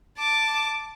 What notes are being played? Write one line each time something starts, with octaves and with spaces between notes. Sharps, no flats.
A5 D6